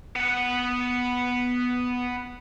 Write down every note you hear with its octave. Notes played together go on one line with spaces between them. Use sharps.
B3 F#5